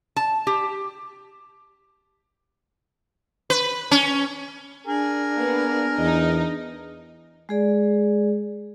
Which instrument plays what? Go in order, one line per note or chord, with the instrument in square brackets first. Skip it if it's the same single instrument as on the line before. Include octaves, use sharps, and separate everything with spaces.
[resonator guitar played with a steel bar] A5
G4
[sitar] B4
C#4
[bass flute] D4 [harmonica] G#4 A#4
[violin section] A#3 B3
[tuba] E2 [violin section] D#4 D#5
[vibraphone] G#3 G#4 D5